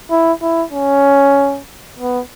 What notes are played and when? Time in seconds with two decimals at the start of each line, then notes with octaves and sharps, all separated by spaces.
0.11 E4
0.42 E4
0.72 C#4
1.99 B3